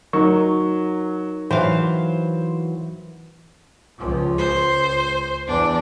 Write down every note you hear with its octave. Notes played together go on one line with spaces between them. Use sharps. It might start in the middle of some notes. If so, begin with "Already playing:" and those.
F#3 D#4 A#4 C#6
E3 F#3 C5 F5
C#2 F3
C#2 C5
E2 D4